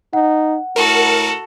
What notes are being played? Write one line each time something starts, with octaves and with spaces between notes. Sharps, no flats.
D#4 F#5
A2 F#4 A4 A#4